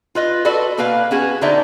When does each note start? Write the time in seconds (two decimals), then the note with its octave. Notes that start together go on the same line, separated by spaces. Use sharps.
0.15 F4 B4 D#5
0.45 F#4 A4 B4 D5 D#5
0.78 B2 A#3 B4 F5
1.11 B3 C#4 F#4 G#4
1.41 D3 D#4 C5 D5 E5 A#5